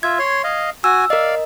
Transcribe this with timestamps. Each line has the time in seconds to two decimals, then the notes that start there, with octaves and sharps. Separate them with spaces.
0.03 F4 E5 G#6
0.19 C#5 C6
0.44 D#5 F5
0.84 F#4 G#5 E6
1.10 A#4 D5 D#5 F5